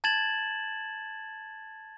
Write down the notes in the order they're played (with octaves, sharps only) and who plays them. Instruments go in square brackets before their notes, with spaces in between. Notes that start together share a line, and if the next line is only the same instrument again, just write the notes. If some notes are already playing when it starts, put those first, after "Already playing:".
[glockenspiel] A5 G#6 A6 E7 F#7